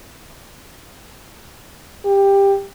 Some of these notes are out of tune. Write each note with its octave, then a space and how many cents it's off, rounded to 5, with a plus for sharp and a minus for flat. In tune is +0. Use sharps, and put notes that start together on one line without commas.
G4 +15